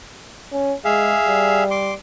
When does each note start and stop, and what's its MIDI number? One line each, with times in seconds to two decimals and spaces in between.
0.52 0.73 61
0.85 1.16 56
0.85 1.64 68
0.85 1.64 76
0.85 1.64 77
1.28 1.95 55
1.71 1.94 84
1.71 1.94 86